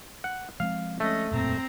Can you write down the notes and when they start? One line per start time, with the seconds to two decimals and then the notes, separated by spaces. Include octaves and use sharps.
0.24 F#5
0.60 F3 G#3 C4 F5
1.00 A3 C#4 D#5
1.31 E1 F#2 A#2 C4 A#5